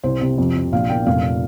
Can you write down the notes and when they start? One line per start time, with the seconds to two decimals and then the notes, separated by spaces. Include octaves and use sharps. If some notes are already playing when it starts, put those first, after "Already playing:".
0.03 C2 C5
0.21 C3
0.38 F2
0.56 C3
0.72 A#1 F5
0.89 A#2 G5
1.06 F1 F5